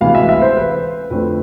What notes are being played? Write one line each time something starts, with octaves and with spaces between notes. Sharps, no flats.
D2 C3 E3 G#3 B3 F5
E5
F5
E5
C5
B4
F2 D3 A3 C4 B4